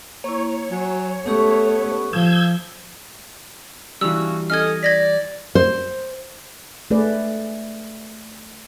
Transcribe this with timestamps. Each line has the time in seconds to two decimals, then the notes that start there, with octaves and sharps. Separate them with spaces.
0.24 A#3 E4 C#5
0.71 F#3 G#5
1.26 A3 B3 C#4 G4 C#6
2.13 F3 D#6 E6 G6 G#6
4.01 E3 G3 A#3 C#4 F#4 E6
4.50 C#4 A4 D#5 F6 G#6
4.83 D5 G#6 A#6 B6
5.55 C5
6.91 A3 G#4 B4 D5